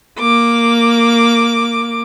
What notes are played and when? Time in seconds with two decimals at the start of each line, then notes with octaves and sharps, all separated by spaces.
0.19 A#3 D6